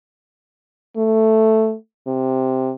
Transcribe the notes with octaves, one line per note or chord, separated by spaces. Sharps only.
A3
C3